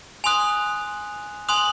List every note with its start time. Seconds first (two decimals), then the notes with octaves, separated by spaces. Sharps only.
0.24 G#5 C6 D#6 F#6 F7
1.49 G#5 C6 D#6 F#6 F7
1.56 F#7